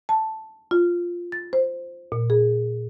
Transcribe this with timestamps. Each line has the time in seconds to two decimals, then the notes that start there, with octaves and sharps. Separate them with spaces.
0.09 A5
0.71 F4
1.32 A6
1.53 C5
2.12 A#2
2.30 G#4